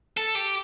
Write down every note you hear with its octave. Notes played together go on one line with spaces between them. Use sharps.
A4
G4